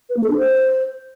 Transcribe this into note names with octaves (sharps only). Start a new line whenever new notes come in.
B4
A#3
A4
D4
C5